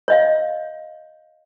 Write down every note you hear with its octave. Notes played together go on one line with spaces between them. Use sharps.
C#5 D#5 F5